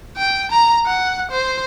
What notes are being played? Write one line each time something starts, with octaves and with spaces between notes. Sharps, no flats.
G5
A#5
F#5
C5